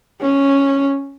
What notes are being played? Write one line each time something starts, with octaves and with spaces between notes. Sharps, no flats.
C#4